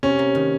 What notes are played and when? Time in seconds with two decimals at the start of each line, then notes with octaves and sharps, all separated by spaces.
0.03 C3 C#4
0.19 A#3
0.35 D#3